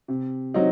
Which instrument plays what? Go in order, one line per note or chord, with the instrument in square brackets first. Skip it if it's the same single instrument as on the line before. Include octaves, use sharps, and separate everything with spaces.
[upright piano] C3
F#3 C4 D#4